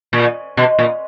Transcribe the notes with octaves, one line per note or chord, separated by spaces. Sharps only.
A#2
B2
A#2